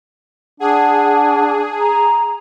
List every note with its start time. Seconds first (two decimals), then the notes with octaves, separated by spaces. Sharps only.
0.60 D4 G#4 F#5
1.80 A#5